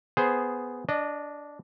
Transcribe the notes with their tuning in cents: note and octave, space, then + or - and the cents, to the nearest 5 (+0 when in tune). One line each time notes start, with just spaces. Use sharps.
B3 +5 G#4 +0 C5 +0
D4 -10 D#5 -30